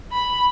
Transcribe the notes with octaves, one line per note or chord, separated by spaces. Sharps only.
B5